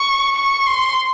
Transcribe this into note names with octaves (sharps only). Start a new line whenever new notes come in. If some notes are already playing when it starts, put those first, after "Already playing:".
Already playing: C#6
C#6
C6